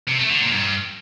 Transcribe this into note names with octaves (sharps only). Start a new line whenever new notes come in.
C3
A3
D3
A#2
G2